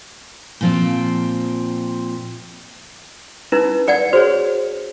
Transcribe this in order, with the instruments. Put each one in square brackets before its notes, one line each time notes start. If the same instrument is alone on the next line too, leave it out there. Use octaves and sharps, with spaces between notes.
[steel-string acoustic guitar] A#2 F3 C4
[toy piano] C#4 D#4 E4 [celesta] B4
[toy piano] B4 D5 F#5 [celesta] G#6 C#7
[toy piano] F#4 G#4 C#5 [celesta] C5